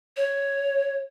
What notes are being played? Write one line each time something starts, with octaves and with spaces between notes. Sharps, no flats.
C#5